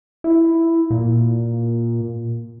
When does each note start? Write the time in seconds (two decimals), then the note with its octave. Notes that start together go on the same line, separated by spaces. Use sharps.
0.24 E4
0.90 A#2